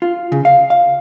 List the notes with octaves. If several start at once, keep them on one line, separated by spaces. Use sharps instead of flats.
F4
C#3
F5
F5